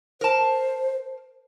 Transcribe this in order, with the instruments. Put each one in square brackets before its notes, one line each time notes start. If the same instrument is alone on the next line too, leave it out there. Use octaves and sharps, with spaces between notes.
[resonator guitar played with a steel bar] A#4 A5 [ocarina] C5